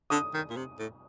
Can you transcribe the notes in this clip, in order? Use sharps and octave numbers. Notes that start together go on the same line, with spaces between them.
D3 D#6
D#3
A#2
C3
A2